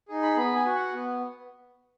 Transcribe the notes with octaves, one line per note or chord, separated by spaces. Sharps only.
D#4 G#4
B5
B3 B5
G#5
F#4
F#5
B3